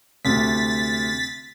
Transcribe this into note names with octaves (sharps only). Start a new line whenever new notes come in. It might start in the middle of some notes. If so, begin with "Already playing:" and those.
D2 C3 A6 B6